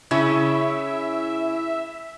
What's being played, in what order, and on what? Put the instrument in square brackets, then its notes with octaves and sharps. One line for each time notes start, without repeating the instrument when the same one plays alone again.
[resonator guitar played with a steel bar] C#3 C#4 [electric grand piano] E4 [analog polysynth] E5